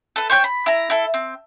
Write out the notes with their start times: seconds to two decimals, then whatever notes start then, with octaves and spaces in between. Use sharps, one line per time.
0.16 A4 B4
0.30 C5 C#5 G5 G6
0.44 B5
0.66 E4 A#5
0.90 E4 A4
1.14 C4